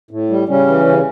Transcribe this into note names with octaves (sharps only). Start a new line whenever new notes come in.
A2
G3
C#3 G3 C#4
E3
C#3